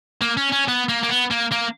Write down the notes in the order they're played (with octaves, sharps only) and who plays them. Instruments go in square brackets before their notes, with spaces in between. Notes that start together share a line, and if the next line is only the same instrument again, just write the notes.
[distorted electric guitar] A#3
C#4
C#4
B3
A#3
A#3
B3
A#3
A#3